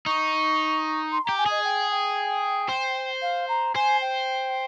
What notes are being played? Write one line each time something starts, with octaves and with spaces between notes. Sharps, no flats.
D#4 C#6
C6
G4 A#5
G#5
G#4 D#5
G5
G5
C5
F5
A#5
C5 G#5
G5